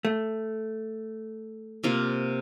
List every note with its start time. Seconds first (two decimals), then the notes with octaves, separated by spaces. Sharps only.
0.05 A3
1.84 C3 A#3 F4